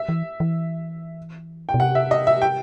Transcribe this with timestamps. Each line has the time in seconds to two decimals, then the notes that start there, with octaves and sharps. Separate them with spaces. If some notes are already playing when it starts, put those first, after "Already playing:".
Already playing: E5
0.09 E3
0.40 E3
1.69 G5
1.74 B2
1.80 C3 F#5
1.95 E5
2.11 D#5
2.27 E5
2.42 G5